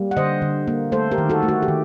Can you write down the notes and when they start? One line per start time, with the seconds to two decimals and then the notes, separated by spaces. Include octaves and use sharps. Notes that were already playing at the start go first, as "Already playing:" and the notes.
Already playing: G3 A#3
0.11 F#5
0.17 D3 C5 D#5
0.42 D3
0.68 A#3
0.92 A3 A4 C5
1.11 G4 A#4
1.18 D#3
1.29 F#4 A4
1.43 A3
1.48 F#4
1.63 G4
1.68 D#3